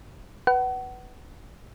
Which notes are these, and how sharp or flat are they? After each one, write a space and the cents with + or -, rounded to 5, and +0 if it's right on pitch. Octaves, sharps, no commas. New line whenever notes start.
B4 +0 F#5 +30